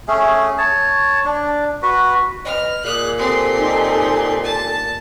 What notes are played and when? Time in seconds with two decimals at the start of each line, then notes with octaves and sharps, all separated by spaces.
0.08 A3 C#4 G#4
0.58 C#5 A5
1.25 D4
1.82 F#4 B4
2.45 B4 D#5 F6
2.85 A#2 G#4 D6 F#6
3.18 C4 G4 A4 G#5 C6
3.57 D#4
4.44 A5